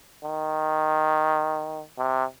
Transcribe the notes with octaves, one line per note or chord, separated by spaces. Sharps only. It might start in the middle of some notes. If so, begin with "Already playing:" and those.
D#3
C3